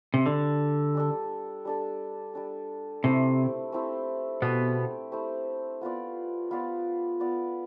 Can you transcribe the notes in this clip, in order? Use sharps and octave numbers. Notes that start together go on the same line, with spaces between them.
C3
D3 G3 D4 A4
G3 D4 A4
G3 D4 A4
G3 D4 A4
C3 A3 C4 E4 G4
A3 C4 E4 G4
B2 A3 B3 C4 E4 G4
A3 C4 E4 G4
B3 F4 B4 D5
B3 F4 B4 D5
B3 F4 B4 D5